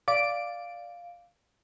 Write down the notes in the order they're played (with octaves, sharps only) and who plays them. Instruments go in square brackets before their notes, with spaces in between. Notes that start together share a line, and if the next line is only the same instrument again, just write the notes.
[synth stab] D5 D7 [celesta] F5